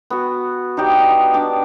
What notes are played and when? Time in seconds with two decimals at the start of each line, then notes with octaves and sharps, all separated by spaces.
0.10 B3 F#4
0.77 D#4 F#4 G4 D5
1.34 D4 D5 G5